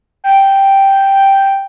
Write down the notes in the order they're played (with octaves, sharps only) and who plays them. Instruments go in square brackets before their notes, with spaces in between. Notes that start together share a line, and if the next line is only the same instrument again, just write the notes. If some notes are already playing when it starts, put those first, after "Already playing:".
[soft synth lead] G5